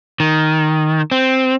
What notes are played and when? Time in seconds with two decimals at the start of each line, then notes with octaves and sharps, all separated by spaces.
0.20 D#3
1.11 C4